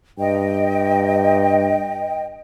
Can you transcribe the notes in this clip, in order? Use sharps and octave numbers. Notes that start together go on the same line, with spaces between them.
G2 D#5 G5